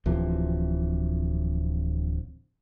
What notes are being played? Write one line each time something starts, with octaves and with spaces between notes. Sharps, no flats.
D1 C3 E3 F3